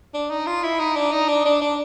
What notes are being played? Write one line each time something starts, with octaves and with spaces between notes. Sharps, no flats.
D4
D#4
F4
E4
D#4
D4
D#4
D4
D4
D4